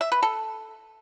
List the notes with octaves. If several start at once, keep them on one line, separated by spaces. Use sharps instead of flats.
E5
B4
A4